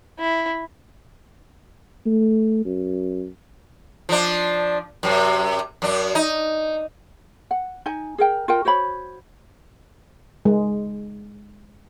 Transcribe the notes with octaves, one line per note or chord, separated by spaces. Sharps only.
E4
A3
F#2
F3 D4
F#2 C3
F#2 D4
D#4
F#5
D#4 G#5
G#4 A#4 G5
F4 A#4 G5
F#4 C5 C#5 B5
G#3